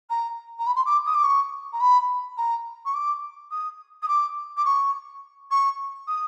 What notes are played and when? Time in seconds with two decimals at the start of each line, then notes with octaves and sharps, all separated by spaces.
0.09 A#5
0.58 A#5
0.66 B5
0.75 C6
0.85 D6
1.06 D#6
1.14 D6
1.23 C#6
1.72 A#5
1.80 B5
2.37 A#5
2.85 C#6
2.94 D6
3.50 D#6
4.02 D#6
4.08 D6
4.56 D6
4.65 C#6
5.51 C#6
6.07 D#6